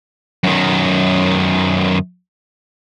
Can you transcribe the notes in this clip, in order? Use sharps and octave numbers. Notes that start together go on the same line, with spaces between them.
F#2 D#3